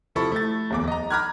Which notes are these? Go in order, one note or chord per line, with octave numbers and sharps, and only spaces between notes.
C3 F3 E4 A4 B5 C#6
A3 A6
D1 E2 D6
D#5 A#5
A#5 B5 D6 F6 F#6 G#6